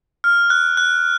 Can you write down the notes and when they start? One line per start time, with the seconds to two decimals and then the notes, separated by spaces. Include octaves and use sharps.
0.24 F6
0.50 F#6
0.77 F#6